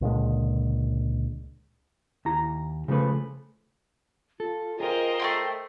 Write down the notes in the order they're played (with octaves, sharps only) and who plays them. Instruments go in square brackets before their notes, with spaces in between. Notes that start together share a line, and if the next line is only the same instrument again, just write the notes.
[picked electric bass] C#2 A#2 D3 G#3
[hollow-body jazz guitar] D#2 E4 A#5
C#3 F3 G#3 A3 B4
[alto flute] F4 [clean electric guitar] A4
[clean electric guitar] F4 G#4 [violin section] A#4 C5 D#5 [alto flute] G5
[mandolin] A3 A#3 C6